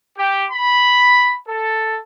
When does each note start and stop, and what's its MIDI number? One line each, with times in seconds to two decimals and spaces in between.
0.17 0.44 67
0.50 1.35 83
1.48 1.98 69